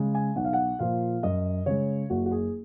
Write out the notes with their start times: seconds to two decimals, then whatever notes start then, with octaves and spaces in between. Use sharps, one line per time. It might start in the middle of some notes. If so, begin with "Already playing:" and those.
Already playing: C#3 G#3
0.15 G#5
0.36 B1 F#5
0.45 F5
0.53 F#5
0.79 A#2 F3 F5
1.23 F#2 D#5
1.66 C#3 G#3 C#5
2.10 F#1 F#4
2.26 F#4
2.31 G#4